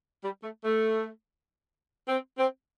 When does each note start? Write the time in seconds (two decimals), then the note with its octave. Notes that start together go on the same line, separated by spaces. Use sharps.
0.24 G3
0.44 A3
0.65 A3
2.08 C4
2.38 C4